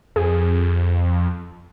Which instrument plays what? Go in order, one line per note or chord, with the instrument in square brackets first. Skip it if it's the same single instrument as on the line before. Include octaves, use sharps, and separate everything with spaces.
[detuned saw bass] F2 [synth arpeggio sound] G#4